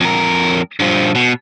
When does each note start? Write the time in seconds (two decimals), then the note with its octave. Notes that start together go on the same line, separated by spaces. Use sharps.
0.01 F2 A#4
0.80 G2 F3
1.15 B2